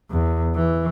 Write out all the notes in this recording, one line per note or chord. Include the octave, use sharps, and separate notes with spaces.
E2
E3